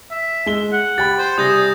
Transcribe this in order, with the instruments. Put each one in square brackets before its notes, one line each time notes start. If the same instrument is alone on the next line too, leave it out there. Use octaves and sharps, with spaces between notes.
[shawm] E5
[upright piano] G#3 G7
[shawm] F#5
[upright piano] G4 G5 B5 [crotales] A6
[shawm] C5
[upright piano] C3 G3 [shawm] G#4 [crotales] D#6 G6 A#6